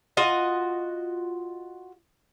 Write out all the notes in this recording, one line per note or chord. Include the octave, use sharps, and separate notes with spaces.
F4 F#4 D#5